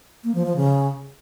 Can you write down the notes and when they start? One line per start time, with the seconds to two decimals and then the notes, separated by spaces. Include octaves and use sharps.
0.24 A#3
0.35 F3
0.46 F3
0.56 C#3